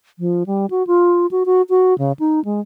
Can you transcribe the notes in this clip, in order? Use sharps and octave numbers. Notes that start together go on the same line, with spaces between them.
F3
G3
F#4
F4
F#4
F#4
F#4
C#3
D#4
G#3